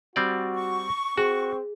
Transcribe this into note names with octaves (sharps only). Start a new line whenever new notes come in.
G3 C4 F#4 D5
C#6
C4 F#4 G#4